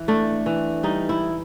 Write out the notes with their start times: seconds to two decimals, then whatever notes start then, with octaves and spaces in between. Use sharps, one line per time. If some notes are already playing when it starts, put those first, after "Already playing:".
Already playing: E3
0.08 A3 D4
0.46 E3
0.83 G3 D#4
1.09 E4